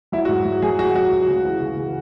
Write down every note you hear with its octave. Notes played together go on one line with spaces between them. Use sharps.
F#3 E4
F#4
G#2
F#3
F#3 G#4
F#3 F#4
F#3 F#4
C#2
C#3
E3
C#3
C#3